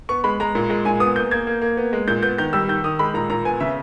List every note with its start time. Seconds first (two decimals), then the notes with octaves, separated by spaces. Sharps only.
0.09 B3 C#6
0.24 G#3 B5
0.40 G#3 A#5
0.55 A#2
0.70 G#3
0.85 A#2 G#5
1.00 B3 D#6
1.16 A#3 G6
1.31 A#3 G#6
1.47 A#3
1.62 A#3
1.77 B3
1.93 G#3
2.08 A#2 G6
2.23 B3 G6
2.38 D#3 G6
2.53 G3 E6
2.68 D#3 G6
2.84 D#3 D#6
2.99 G#3 B5
3.14 A#2 A#5
3.30 A#2 A#5
3.45 B3 G#5
3.60 C#3 E5